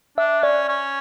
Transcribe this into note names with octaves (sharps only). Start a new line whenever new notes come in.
D4 E5
C#4 D5
C#4